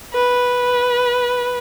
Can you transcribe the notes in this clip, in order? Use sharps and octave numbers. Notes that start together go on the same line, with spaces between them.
B4